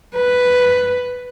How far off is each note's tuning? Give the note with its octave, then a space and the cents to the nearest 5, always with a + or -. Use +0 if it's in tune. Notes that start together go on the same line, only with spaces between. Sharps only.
B4 +5